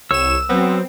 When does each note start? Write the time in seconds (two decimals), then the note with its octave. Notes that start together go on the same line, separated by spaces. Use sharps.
0.11 C2 C#5 E6 E7
0.49 F#3 B3 C4